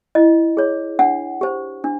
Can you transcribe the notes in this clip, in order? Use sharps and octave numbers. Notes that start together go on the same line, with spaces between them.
E4 D#5
G#4 C#5
D4 F#5
G4 C5
D4